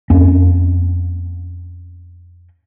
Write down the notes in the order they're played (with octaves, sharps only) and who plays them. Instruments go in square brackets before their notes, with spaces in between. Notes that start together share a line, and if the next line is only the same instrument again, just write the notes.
[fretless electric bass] F2 A#3 C#4